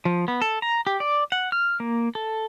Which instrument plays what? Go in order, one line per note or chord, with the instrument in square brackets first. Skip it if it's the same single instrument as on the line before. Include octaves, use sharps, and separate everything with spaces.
[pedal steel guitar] F3
B3
A4
A#5
G4
D5
F#5
F6
A#3
A4